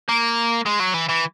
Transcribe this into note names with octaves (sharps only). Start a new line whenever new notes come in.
A#3
G#3
F#3
E3
E3